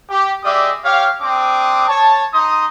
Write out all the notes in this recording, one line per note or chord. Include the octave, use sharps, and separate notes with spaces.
G4
G#3 G4 D5 E5 D#6
G4 C#5 F5
C4 D4 D6 D#6
C#5 A5
D#4 C6 D#6